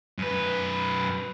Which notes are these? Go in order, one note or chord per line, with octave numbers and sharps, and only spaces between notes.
F#2 B4